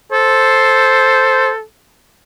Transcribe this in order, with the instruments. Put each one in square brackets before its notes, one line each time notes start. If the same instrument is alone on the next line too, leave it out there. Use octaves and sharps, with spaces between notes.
[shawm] A4 [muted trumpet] C5